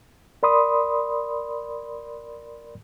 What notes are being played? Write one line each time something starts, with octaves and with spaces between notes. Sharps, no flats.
A#4 D5 B5 C6 D#6